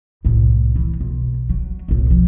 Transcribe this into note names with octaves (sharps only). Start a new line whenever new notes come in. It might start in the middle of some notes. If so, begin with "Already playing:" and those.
C2 A2
E3
B1
F#3
B1 A2
F3